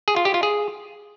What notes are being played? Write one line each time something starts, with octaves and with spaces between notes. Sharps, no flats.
G#4
F4
G4
F4
G#4